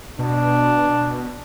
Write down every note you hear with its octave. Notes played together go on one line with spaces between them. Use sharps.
B2 D4